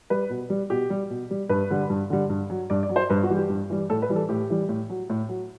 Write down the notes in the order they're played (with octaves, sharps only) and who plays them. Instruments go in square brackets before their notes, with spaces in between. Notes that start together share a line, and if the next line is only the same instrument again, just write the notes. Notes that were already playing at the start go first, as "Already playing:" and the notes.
[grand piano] G3 B4
B2
G3
B2 G4
G3
B2
G3
G2 B4
D3 G3
G2
D3 G3
G2
F#3
G2 D5
D5
F#3
C5
G2 B4
F#4
E3 G3
G4
G2
E3 G3
A2 A4
B4
E3 G3
A4
A2 G4
E3 G3
A2
F#3
A2
F#3